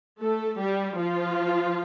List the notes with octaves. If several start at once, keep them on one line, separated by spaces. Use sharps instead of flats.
A3 A4
G3 G4
F3 F4